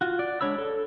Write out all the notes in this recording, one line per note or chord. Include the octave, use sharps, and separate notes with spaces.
F4 F#4
D5
G#3 D4 C#5 B5 E6
A4